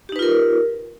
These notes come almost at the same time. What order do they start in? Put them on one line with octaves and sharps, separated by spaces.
G4 D#4 B4 F4 A#4